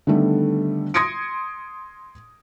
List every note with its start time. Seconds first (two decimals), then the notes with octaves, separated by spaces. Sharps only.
0.07 D3 D#3 G3 A3 B3
0.94 C6 D#6 G#6 A#6 C#7 D7